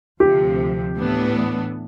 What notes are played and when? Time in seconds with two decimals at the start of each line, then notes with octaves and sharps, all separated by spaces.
0.20 D2 C3 F3 G4
0.97 A2 E3 B3 D4